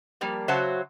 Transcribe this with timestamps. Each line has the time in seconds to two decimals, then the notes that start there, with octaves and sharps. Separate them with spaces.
0.21 F3 G3 A#3
0.48 C#3 F#3 F#4 C5 E5 A5